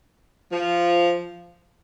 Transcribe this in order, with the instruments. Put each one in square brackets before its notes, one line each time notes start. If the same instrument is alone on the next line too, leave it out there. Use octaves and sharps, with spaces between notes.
[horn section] F3